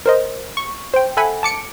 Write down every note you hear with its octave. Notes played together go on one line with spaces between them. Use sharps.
A#4 C5 D#5
C#6
C5 G5
A4 E5 F#5 G#5 B5
A5 D6 C#7 D7